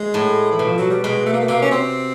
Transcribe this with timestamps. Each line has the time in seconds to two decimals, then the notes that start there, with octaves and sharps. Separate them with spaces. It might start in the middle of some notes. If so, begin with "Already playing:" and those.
Already playing: G#3
0.14 A2
0.52 E3
0.59 B2
0.65 F3
0.78 F#3
0.90 G3
1.04 B2 G#3
1.26 A3
1.33 A#3
1.41 A3
1.48 C3 A#3
1.62 C#4
1.71 C4